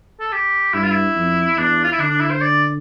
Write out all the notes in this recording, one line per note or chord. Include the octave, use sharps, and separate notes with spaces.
A4
G4
G2 E4
F4
E4
F2
E2 D4
F4
E4
D3 D4
D4
E4
C5
D5